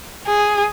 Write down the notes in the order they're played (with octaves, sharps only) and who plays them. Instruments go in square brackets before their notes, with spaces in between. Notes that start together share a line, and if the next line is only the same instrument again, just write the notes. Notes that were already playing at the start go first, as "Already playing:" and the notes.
[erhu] G#4